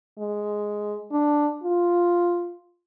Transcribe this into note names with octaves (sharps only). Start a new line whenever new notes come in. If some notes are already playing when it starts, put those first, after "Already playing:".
G#3
D4
F4